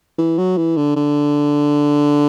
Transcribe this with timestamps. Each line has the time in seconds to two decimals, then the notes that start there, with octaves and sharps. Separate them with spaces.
0.18 E3
0.38 F#3
0.57 E3
0.77 D3
0.96 D3